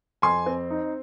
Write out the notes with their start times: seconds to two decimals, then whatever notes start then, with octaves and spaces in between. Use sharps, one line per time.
0.22 F2 G#5 C6
0.46 C4
0.70 D#4